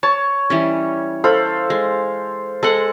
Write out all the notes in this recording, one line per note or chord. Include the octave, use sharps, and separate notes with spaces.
C#5 A5
E3 G3 C#4
A4 C5 F5 B5
G#3
G#3 A4 C5 F#5